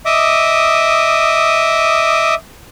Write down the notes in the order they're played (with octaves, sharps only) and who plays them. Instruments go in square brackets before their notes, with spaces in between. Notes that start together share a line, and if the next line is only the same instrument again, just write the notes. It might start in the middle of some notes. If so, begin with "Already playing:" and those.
[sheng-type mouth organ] D#5 E5 D6 D#6